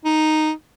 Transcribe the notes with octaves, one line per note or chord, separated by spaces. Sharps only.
D#4